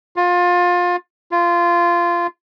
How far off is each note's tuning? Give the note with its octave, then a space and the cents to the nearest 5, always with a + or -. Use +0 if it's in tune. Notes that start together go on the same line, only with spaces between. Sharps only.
F4 +25
F4 -15